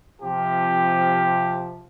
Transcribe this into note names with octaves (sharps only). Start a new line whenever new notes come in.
C3 F3 G4